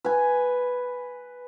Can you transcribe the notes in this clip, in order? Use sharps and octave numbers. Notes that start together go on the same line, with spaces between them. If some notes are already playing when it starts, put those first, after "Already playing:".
B4 G#5